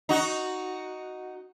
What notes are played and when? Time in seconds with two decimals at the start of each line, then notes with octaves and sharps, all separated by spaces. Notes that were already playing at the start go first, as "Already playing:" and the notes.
0.09 D#4 F#4